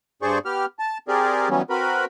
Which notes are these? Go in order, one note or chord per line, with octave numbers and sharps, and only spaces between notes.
G2 G#4 C5 D5 C#6
B3 G4 F6
A5
C4 G4 G#4 A#4 D5
E3 F#3 G3 B3 C#4
C4 F#4 A#4 B4 B5